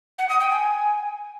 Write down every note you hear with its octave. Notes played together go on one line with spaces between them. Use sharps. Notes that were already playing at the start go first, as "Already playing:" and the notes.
F#5
D#6
G5
G#5